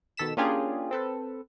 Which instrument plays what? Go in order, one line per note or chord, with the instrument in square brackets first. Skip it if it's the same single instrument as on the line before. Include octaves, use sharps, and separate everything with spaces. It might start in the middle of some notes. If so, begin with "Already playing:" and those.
[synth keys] B2 D#3 A4 B6 E7
A#3 C#4 D4 F4 G4 G#4
C4 A4 B4